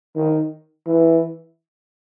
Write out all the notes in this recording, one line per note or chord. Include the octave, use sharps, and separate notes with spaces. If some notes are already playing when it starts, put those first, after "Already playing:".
D#3
E3